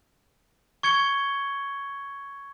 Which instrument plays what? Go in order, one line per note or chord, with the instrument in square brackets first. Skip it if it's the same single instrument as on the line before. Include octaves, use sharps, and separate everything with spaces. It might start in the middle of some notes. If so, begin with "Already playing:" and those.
[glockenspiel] C#6 G#6 C#7 G7